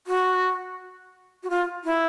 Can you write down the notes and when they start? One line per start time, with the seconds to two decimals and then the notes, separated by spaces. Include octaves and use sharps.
0.07 F#4
1.43 F#4
1.50 F4
1.85 E4